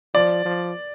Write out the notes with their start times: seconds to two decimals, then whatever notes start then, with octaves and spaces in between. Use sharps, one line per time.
0.14 F3 D5
0.45 F3